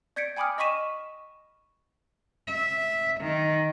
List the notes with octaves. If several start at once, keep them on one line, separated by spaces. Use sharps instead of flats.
D5 G6 G#6 B6 C#7 D7
G5 G#5 B5 D6 D#6 F6
D#5 B5 C#6 B6 D#7 E7
E5
D#3